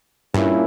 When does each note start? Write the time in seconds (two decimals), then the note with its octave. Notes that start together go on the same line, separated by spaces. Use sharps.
0.34 G2 A#2 A#3 C#4 E4